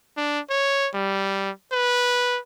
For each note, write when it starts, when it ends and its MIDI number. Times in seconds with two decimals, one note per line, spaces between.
0.17 0.40 62
0.49 0.89 73
0.94 1.50 55
1.72 2.39 71